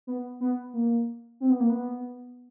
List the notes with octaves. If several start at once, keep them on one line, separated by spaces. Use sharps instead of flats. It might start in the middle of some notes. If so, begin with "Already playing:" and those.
B3
B3
A#3
C4
B3
A#3
B3